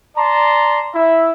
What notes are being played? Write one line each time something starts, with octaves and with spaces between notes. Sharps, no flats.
D5 A5 A#5 C6
E4 E5